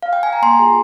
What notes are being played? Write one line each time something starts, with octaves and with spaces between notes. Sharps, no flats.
F5
G5
G#5
A#5
A#3 C6
F4 G#4